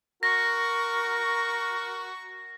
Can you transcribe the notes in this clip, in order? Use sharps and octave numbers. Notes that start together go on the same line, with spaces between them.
F#4 A#4 C#6 A#6